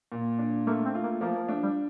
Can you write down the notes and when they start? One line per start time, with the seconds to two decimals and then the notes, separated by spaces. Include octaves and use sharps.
0.12 A#2
0.39 D4
0.67 A3 A#3
0.85 C4
0.95 F4
1.03 A#3
1.21 F3 A#3
1.35 A#3
1.48 A3 D4
1.63 G3